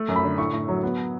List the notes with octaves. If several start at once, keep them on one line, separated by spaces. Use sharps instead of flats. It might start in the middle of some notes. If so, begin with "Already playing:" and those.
Already playing: A3
F#2
B5
D3
A2 C#6
A2
F#3
B3